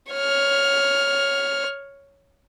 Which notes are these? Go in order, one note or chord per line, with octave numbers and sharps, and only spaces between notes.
C#5 F6